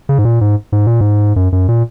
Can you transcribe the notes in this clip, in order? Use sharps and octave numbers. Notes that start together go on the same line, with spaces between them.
C#3
G#2
A#2
G#2
G#2
A#2
G#2
F#2
F#2
A#2